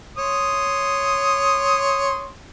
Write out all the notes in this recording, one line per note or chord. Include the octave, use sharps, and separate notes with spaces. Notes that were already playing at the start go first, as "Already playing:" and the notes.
C#5 C6 D#6